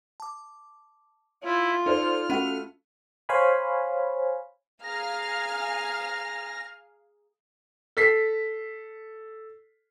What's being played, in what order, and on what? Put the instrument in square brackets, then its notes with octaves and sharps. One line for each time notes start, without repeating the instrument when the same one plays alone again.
[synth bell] A5 D6
[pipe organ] E4 [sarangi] F4
[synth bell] D#4 [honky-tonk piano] A4 C5 D5 [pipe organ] F6
[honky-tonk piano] A3 F#4 A4 [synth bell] C#4 B5 D#7
[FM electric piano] C5 C#5 F5 G#5 B5
[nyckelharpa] G#4 A#5 [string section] F5 G#5 F6 [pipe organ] A#6
[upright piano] A4 B6 C7